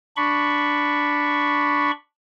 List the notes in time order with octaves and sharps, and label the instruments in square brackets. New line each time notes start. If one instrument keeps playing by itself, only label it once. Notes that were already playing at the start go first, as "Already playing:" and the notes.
[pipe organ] D4 B5 C#6